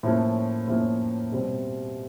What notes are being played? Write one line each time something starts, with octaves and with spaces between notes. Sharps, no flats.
A2 F3 A#3 C#4
A2 F3 A#3 C#4
B2 G3 C4